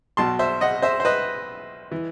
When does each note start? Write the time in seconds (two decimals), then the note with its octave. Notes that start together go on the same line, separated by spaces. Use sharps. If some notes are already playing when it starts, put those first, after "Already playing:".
0.17 B1 B2 A5 C6
0.39 C5 E5
0.61 D#5 F#5
0.82 C5 E5
1.00 C5
1.05 B4 D#5
1.92 E3